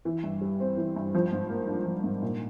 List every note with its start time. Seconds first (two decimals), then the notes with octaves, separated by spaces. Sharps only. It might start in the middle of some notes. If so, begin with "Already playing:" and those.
0.05 E3
0.24 G2
0.41 G3
0.60 C4
0.77 E3
0.96 G2
1.14 F3
1.32 G#2
1.50 A#3
1.68 D4
1.86 F3
2.04 G#2
2.22 A#2